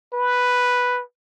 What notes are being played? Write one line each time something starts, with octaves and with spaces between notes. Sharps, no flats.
B4